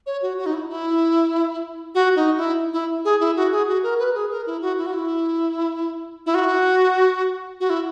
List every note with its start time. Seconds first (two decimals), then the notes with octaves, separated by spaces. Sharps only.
0.06 C#5
0.22 F#4
0.38 F#4
0.46 D#4
0.54 E4
0.69 E4
1.95 F#4
2.16 D#4
2.37 E4
2.73 E4
3.05 G#4
3.20 E4
3.36 F#4
3.52 G#4
3.68 F#4
3.83 A#4
3.99 B4
4.15 G#4
4.31 A#4
4.46 E4
4.62 F#4
4.78 E4
4.86 F#4
4.93 E4
6.26 E4
6.34 F#4
7.60 F#4
7.70 E4